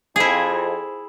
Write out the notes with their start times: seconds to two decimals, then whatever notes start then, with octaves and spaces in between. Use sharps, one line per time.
0.16 F2 E4 G#4